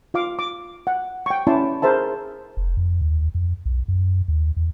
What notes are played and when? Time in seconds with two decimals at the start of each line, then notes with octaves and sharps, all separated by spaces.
0.14 F4 F5 D6
0.39 D6
0.87 F#5
1.26 G5 C#6
1.47 C#4 E4 D5 A5 C6
1.82 G#4 A#4 C5 E5 A5
2.57 F1
2.77 F2
3.01 D#2
3.35 F2
3.65 B1
3.88 F#2
4.28 D#2
4.57 E2